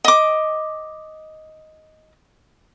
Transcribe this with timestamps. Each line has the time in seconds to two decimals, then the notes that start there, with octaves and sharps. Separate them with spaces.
0.05 D#5 D6